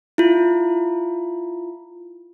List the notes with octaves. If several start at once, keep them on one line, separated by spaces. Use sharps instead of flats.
E4 F4